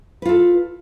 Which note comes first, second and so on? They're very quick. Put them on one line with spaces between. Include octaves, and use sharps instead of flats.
B4 F4 A4